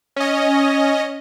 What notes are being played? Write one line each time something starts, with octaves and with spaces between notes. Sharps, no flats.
C#4 D#5